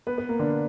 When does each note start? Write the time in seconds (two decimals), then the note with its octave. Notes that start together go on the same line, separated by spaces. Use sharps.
0.07 B3 B4
0.18 B3 B4
0.29 A#3 A#4
0.39 D3 D4